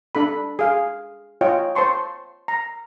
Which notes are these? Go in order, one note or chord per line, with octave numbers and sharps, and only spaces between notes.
D4 A4 B5
G#4 F5
F4 C#5 D#5 G5
C5 A5 C6 C#6
A#5